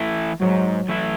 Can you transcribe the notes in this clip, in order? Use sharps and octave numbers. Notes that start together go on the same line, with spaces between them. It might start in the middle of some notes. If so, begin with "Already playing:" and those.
Already playing: E3 A3 E4
G#2 F#3
E3 A3 E4